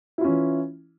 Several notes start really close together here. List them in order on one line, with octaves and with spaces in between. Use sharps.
E4 F4 C#4 E3